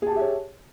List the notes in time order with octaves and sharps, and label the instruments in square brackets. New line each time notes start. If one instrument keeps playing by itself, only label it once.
[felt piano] G#4
A5
G4
E5
C#5